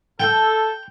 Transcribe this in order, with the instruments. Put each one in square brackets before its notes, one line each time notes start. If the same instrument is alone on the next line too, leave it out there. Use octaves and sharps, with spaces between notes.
[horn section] A4 [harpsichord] G5